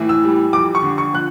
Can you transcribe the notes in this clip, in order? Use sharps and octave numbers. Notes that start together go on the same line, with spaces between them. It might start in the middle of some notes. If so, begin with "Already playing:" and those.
Already playing: A2 E3
E6
G3
F2 D6
C#6
D3
C#6
F3 F#6